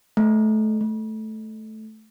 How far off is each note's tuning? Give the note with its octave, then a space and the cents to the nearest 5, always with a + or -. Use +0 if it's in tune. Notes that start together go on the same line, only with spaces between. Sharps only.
A3 -25
A3 -10